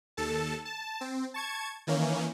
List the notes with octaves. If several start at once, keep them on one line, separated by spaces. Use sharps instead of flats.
D#2 A4 A5
A5
C4
A5 C#6 G#6
D#3 E3 A#3 C#4